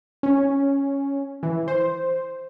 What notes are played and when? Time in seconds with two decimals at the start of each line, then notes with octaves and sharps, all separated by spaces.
0.23 C#4
1.43 E3
1.68 C5